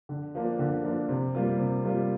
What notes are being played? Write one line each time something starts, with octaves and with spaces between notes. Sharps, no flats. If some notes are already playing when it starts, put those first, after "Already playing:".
D3
F3 A#3 D4
D3
F3 A#3 D4
C3
G3 A#3 F4
C3
G3 A#3 F4